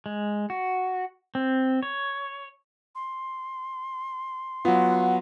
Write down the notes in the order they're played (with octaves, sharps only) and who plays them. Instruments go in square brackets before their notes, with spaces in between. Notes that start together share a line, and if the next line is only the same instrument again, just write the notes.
[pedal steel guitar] G#3
F#4
C4
C#5
[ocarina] C6
[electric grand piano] F#3 B3 [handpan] F4 [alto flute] F#5